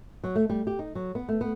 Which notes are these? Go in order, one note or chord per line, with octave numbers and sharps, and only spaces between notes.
F#3
A3
G3
G4
D#4
F#3
B3
A3
B3